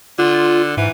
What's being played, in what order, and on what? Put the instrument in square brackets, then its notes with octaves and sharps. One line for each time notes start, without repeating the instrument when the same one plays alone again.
[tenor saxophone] D3 [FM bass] F4
[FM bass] G#2 [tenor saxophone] E3